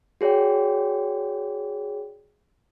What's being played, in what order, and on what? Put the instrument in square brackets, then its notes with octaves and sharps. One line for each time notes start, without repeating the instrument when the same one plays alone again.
[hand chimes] F#4 G#4 C#5 D5 G5